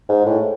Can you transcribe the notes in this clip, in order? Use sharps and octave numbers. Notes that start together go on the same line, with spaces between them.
G#2
A2